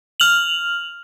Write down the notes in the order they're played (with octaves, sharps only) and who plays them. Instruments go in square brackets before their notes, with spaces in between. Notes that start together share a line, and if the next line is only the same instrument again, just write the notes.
[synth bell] F6 F7 F#7